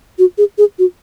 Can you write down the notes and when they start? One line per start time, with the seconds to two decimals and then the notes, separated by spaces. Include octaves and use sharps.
0.19 F#4
0.38 G#4
0.58 G#4
0.79 F#4